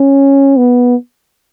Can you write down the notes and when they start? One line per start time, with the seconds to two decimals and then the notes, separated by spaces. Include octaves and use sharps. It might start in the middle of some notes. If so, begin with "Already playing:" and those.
Already playing: C#4
0.57 B3